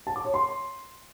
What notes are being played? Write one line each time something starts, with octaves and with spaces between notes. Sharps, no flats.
A5
D6
C#5
C6